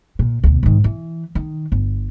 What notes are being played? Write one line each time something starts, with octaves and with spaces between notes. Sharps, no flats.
A#2
D2 B2
G#2 D#3
E3
D#3
G1